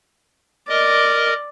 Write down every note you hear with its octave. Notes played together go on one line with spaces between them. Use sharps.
A#4 D5 D#5